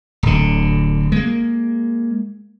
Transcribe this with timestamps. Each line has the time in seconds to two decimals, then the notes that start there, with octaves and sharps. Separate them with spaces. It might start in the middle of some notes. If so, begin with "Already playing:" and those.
0.23 D1 D3
1.12 G#3 A#3